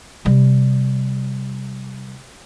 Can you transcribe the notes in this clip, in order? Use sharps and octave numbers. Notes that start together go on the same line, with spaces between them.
C3 G3